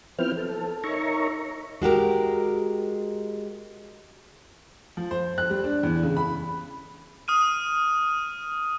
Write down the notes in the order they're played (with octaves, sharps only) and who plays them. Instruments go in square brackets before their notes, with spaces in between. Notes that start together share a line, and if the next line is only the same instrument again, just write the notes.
[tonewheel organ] F3 B3 C4 E4 G5 F6
A4
D#4 A#4 C#5 E5 A#5 C#6
[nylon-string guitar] G#3 F#4 G4 A#4
[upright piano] F3
C5
F#6
G3
D4
E2
C#3
B5
[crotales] D#6 F6 D#7